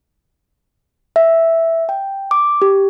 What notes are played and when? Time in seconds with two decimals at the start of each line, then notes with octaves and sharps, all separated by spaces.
1.16 E5
1.89 G5
2.31 D6
2.62 G4